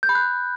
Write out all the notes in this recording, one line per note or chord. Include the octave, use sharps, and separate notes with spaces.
G6
B5
F#6